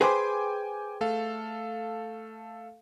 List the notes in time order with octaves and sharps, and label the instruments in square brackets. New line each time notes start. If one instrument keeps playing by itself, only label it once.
[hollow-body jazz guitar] G#4 B4 C5 [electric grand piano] G5 G#5 D6
[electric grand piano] A3 A4 F5